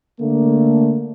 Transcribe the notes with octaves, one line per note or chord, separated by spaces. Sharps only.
D3 A3 A#3